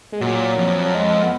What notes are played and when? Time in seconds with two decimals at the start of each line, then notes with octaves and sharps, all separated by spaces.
0.12 G#3
0.21 A#2 F#3
0.58 F2
0.85 F#3
0.95 G#3
1.23 B3